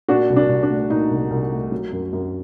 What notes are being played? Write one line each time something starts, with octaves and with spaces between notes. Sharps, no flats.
A#2 D4 F#4
C2
D4
C2
D4
A3
A#2 D#4
C2
C2
A3
F#3
F#2
F#2